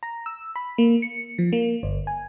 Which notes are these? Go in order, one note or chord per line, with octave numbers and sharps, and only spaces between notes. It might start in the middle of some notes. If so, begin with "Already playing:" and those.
A#5
E6
B5
A#3
C#7
F3
A#3
G1
G#5